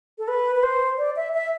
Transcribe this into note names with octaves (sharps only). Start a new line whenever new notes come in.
A4
B4
B4
C5
D5
E5
E5